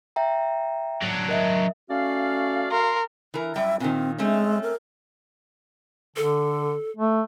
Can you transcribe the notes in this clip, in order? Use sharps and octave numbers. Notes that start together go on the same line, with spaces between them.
E5 G5 A#5
F#3 D4
A#4 D#5 E5
A3 C#4 F#4 D5 F5
A#4 C6
E3 A#4
F#2 G3 E5 G5
A#2 D#3 C4
G#3 A3 C4 C#4
A#4
D3 A4
A3